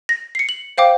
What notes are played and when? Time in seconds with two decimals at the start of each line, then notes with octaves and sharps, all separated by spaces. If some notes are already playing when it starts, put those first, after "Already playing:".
0.09 A#6
0.35 C7 C#7
0.49 F#7
0.78 C5 F5 G5 D6